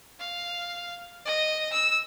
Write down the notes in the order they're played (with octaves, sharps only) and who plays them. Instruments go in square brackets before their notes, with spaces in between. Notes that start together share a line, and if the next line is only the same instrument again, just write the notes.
[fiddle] F5
D#5
E6